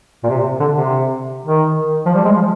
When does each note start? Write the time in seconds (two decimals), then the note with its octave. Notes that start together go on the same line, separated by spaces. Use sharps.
0.24 A#2
0.29 C3
0.60 D3
0.74 C3
1.46 D#3
2.06 F3
2.15 G3
2.25 G#3
2.35 F3